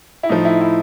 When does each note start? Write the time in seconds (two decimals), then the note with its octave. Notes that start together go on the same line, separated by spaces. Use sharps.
0.23 E4
0.29 A2 F3 D#4
0.45 E4
0.61 E4